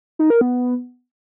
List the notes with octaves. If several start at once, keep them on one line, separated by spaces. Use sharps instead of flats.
D#4
A#4
B3